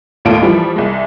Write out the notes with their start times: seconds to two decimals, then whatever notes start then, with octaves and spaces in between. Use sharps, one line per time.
0.25 A1 D#2 A2 F4 A4 D7
0.42 E3 F3 G3
0.76 C2 G#3